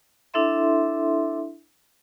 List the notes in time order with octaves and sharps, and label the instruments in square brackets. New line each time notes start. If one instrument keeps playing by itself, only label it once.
[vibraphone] D4 E4 A4 E5 C6